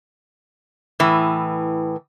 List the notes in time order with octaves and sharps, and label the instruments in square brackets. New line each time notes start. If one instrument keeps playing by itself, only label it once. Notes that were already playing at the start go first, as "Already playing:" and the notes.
[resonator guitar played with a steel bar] A2 E3